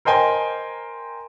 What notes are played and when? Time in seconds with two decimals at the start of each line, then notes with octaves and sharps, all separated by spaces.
0.05 A#4 C5 D#5 G5 G#5 C6